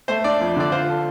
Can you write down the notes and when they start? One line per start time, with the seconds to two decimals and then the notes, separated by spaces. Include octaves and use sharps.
0.08 A3 C5
0.24 D4 D5
0.41 F2
0.56 D3 D5
0.72 F4 C5
0.88 A4